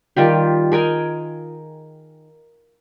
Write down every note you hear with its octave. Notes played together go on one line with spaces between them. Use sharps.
D#3 G3 F4 G4
G#4 A#4 G5 G#5